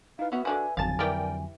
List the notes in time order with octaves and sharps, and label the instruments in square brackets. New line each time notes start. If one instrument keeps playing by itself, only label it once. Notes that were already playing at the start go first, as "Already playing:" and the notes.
[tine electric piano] D#4 E4 B4 [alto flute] F5
[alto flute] B3 [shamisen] C#4 F#4 [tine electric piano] B4 E5
[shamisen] D3 D4 F#4 [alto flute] G#5
[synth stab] G#1 A6 [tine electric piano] F2 D3 F#3 [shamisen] F5 A5 [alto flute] G#5
[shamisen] E3 G4 [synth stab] A#4 D5 G5